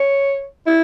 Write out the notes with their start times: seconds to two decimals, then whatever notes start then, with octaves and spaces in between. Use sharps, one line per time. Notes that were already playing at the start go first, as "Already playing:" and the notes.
Already playing: C#5
0.67 E4